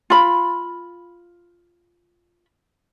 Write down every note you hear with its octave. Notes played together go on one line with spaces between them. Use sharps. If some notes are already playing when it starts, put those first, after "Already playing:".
F4 B5